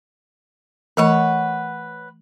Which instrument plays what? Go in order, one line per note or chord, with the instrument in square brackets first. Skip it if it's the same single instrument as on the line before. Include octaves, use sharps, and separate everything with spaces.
[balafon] E3 A3 [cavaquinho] B4 C#5 F#5